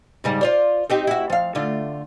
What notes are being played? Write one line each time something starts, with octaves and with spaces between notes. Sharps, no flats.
G#2 C#3 G3
F4 C5 D5
C4 D#4 G4
E4 F#4
F3 F5
D3 A3 F4